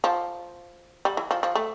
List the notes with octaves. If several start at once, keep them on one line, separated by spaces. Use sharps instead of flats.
F3
G3
E3
F3
F3
A3